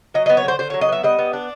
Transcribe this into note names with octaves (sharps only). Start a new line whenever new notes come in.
F#3 D#5
B3 D#5
C#5
D3 C5
D3 C5
F#3 C#5
D#5
B3 E5
G3 D#5
B3
D4